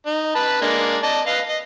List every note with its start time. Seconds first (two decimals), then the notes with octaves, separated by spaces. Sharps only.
0.06 D#4
0.35 B4 A5 B5
0.61 G#3 A#3 D4
1.03 D5 D#5 A5
1.27 B4 D#5 F5
1.48 D#5